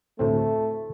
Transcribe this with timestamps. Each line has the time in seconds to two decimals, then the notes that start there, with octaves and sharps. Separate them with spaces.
0.19 D2 A2 A3 C4